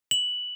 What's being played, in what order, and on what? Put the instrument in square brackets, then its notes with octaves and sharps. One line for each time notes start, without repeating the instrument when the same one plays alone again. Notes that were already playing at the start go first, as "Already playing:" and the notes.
[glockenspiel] F#7